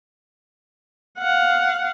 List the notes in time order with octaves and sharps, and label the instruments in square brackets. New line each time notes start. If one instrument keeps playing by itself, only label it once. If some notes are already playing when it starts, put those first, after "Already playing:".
[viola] F5 F#5